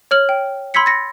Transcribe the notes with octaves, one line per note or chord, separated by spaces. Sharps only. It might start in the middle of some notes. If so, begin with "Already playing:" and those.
C#5 F6 F#7
G5
B5 C6 E6 G#6 B6 C#7
A6 A#6 C#7